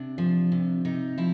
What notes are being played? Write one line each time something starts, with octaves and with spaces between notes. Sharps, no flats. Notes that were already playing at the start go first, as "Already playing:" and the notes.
Already playing: C3 D4
F3
C3
C3 D#4
F3 E4